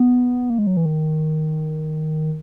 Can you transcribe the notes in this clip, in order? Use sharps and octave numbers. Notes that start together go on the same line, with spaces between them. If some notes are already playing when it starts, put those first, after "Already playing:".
Already playing: B3
A#3
G#3
F#3
E3
D#3